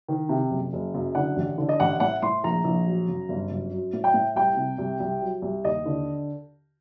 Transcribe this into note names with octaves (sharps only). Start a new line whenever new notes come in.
D#3
C3
F#1
F#1
F#2
D3 F#5
A1
D3
D#5
A1 F#5
A2 F#5
A2 C6
A#1 A#5
A#1
F#3
F#2
G1
F#2
F#3
A2
G5
A2
C2 G5
C3
C2
C2
F#3
C2
D#2 D#5
D3